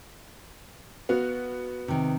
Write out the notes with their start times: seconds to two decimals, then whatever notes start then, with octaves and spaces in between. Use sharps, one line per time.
1.09 B3 F#4 F5
1.88 C3 D#3